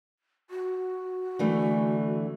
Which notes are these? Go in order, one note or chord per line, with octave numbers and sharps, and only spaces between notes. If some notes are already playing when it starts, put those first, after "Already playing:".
F#4
D3 E3 A3